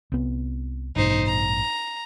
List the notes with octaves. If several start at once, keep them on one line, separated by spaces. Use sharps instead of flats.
C2 B3
A1 G2 B2 D#4 C5
A#5